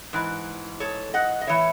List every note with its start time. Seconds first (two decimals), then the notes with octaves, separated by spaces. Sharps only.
0.13 G#2 E3
0.80 A4 C#5
1.14 D#5 F#5
1.42 D#5
1.47 A2 E3 C#5 E5